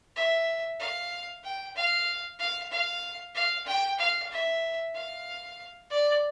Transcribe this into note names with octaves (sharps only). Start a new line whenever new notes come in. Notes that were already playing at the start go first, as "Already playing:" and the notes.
E5
F5
G5
F5
F5
F5
F5
G5
F5
E5
F5
D5